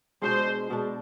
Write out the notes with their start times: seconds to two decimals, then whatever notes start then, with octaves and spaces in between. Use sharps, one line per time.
0.22 B2 G#3 D4 C5
0.70 B2 G#3 D4